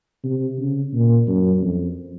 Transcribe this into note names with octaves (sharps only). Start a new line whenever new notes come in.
C3
C#3
A#2
F#2
F2